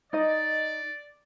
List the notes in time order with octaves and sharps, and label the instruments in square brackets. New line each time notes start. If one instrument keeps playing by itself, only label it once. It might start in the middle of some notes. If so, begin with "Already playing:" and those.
[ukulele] D#4 D#5 [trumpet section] D5